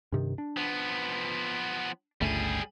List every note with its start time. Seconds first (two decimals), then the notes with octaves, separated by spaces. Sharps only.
0.12 G2 C3 D#3
0.38 D4
0.57 F3 B3
2.21 G1 C#2 G3 A3 G#4